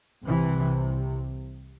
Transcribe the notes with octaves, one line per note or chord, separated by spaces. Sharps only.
C2 C3 E3